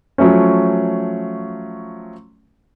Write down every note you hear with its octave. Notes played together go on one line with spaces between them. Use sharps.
F3 F#3 A3 C#4